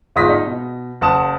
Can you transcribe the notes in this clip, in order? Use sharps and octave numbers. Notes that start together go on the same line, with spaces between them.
G1 G#2 F4 D#6 A#6 B6
D#4
B2
F#1 F#5 A5 D#6 E7